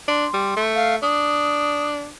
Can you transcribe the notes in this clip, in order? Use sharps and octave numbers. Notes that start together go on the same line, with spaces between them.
D4 C6
G3
A3
F5
D4 D#6